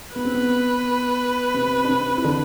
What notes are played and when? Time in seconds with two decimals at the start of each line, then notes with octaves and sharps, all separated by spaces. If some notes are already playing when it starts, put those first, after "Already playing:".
0.15 B3 B4
0.25 C4
0.35 B3
1.54 C3 C4
1.84 D4
1.89 C3 C4
2.18 E4
2.24 D3 D4